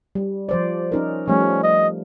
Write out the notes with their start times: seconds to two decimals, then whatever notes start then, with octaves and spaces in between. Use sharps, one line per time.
0.15 G3
0.49 F3 C5 D5
0.92 C#4 D#4 A#4
1.28 F3 G3 A3 C#4
1.63 D#5